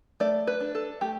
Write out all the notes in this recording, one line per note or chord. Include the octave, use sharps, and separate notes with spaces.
A3 D5
B4
D4
A4
A3 G4